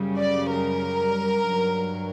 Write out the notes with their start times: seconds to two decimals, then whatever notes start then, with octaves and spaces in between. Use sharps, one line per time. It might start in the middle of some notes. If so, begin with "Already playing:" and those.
Already playing: F#2 C#3 G3
0.19 D5
0.51 A#4
1.44 G2 F#3